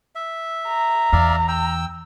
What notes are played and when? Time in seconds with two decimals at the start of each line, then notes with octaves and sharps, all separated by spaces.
0.15 E5
0.68 A#5
1.13 E2 D5 E5 F5
1.48 G5 E6